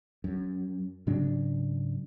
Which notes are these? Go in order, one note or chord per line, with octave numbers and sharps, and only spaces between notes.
F#2
G#2 C#3 F#3 D4